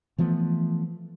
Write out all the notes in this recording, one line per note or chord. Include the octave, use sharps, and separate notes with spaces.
E3 F3 A3 B3